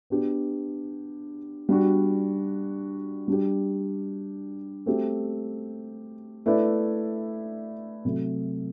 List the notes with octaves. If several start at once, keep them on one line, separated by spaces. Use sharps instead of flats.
B3 D4 G4
G3 D4 F#4
G3 D4 G4
A3 C4 G4
A3 E4 B4 D5
C3 F#3 A3